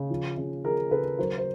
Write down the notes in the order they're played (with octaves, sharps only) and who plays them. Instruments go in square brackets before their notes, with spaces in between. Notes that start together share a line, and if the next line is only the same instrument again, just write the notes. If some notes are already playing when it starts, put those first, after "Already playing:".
Already playing: [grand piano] C#3
F3
C#3
F3 G#4 A#4
C#3 A4 B4
F#3 A#4 C5
C5